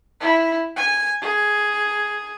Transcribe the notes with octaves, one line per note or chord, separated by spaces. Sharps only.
E4
G#5
G#4